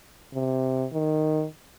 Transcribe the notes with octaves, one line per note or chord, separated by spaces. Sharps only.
C3
D#3